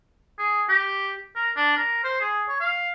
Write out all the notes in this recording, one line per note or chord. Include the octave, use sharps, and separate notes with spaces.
G#4
G4
A#4
D4
A#4
C5
G#4
C#5
F5